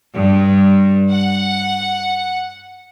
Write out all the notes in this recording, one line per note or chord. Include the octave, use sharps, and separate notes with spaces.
G2
F#5